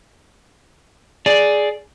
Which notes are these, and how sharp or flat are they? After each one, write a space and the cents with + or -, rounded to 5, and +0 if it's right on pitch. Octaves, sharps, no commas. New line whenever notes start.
G#4 +10 D5 +0